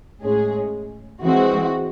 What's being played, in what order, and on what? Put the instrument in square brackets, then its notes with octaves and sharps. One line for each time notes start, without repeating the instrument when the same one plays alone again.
[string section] A2 G#3 C#4 G#4
E3 G#3 C4 F#4